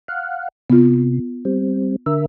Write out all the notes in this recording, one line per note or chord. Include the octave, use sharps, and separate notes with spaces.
F5 F#5
C3 B3 F4
G3 C4
D3 A#4 E5